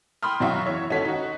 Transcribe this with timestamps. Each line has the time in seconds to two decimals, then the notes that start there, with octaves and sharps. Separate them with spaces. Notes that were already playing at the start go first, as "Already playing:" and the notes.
0.23 G5 B5 C6 D#6 F6
0.40 F#2 F#3 F#4 E5 F5 C#6
0.65 E2 C#5 E5 C#6
0.90 G#1 C#4 F#4 A4 B6
1.05 D#4 F#4